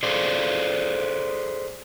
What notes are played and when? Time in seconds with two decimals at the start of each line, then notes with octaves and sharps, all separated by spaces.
0.03 G#4 A4 C5 D5